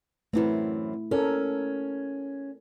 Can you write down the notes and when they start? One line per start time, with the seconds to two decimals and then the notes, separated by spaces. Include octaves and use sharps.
0.33 F#2 E3 A3 C4 E4
1.11 C#4 A4 A#4